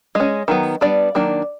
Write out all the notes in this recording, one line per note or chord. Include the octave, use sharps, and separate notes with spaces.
G#3 C#4 D#5
D#3 F#3 B3
G3 B3 D4 D5
D#3 F#3 A#3 D4